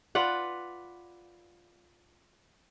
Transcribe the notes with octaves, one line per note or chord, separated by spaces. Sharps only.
F4 B4 D5 F#5